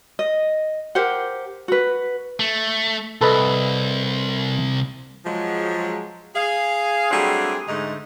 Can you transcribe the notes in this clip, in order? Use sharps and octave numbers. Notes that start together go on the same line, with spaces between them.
D#5
G4 A#4 C5 F#5
F#4 B4
A3
C2 A4 B4 D#5
F3 F#3 G#3
G#4 F5
F#3 G3 A3 C4 D4 G#4
G#2 D3 A3 D#4